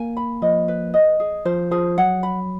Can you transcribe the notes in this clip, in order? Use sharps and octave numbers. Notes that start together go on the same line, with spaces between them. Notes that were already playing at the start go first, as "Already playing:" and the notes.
Already playing: A#3 G#5
B5
F3 D#5
B4
D#5
G#4
F3 C5
F3 G#4
F#3 F#5
B5